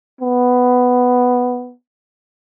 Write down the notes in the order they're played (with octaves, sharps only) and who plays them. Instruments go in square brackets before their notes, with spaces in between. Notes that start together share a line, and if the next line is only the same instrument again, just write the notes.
[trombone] B3